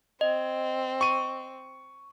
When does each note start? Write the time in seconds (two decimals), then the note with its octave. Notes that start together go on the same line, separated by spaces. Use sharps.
0.21 C4 D#5
1.01 C#6 D#7